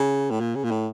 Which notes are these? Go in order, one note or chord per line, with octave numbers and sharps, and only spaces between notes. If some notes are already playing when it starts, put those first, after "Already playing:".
Already playing: C#3
A2
A#2
C#3
A#2
A2